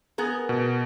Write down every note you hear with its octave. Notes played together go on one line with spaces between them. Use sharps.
B3 G#4 A#4
B2